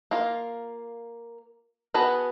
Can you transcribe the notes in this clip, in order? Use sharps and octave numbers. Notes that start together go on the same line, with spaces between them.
A#3 F4
B3 F#4 G#4 B4 A5